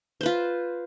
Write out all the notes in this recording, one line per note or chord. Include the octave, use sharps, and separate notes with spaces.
F4 B4 C5